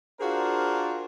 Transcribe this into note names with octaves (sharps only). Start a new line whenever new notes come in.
D4 F4 F#4 G#4 A#4 C5